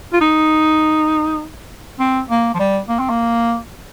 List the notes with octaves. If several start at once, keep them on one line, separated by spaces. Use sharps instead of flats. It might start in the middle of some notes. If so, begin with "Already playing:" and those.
F4
D#4
C4
A#3
F3
G3
A#3
C4
A#3